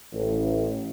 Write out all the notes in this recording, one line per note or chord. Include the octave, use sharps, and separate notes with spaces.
A1